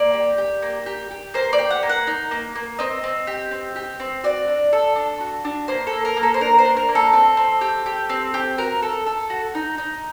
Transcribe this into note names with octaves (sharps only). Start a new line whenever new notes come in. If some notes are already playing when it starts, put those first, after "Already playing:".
Already playing: A#3 D5
G4
G4
A#3
G4
G4
A#3 C5
D5
G4
F#5
A#3
F#5
D#4
A#3
A#3
C4 D#5
C4
G4
C4
G4
C4
F#4 D5
D4
A4
D4
F#4
D4
A#3 C5
A4
A#3
A#4
A#3
A4
C5
D4 A#4
C5
D4
A#4
A#3
A4
C4
C4
G4
G4
C4
G4
F#4 A#4
A4
A4
F#4
D#4
D#4